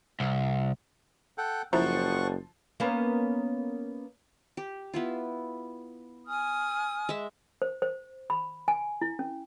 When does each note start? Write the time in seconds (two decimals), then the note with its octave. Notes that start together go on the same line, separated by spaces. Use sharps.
0.20 C2
1.38 A4 F#5 G5
1.73 F#1 F3 E4 E5 F#5 A#5 C#6
2.80 A#3 B3 C#4
4.57 G4
4.94 B3 E4 F4
6.26 G#5 D#6 F6
7.09 G#3 E5
7.62 C5
7.82 C5
8.30 B5
8.68 G#5
9.02 E4
9.19 C#4